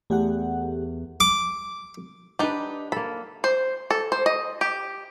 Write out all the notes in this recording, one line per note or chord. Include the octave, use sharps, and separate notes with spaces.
E2 A3 G4 F#5
D6
D4 D#4 G4 B4
A#3 A4 B5
C5
A4
C5
D#5
G4